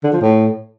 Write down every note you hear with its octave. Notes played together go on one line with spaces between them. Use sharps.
D3
F3
A2